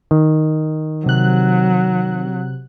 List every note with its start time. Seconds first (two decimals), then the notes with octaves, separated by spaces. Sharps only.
0.11 D#3
1.06 C3 F#3 F#6